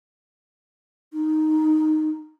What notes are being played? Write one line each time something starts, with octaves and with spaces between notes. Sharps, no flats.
D#4